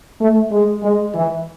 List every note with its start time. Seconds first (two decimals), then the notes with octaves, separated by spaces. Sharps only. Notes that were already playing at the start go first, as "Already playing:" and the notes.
0.20 A3
0.51 G#3
0.83 G#3
1.14 E3